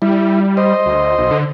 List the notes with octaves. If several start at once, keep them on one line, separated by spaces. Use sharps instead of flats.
G3 E4
C5 D#5
D2
B1
D3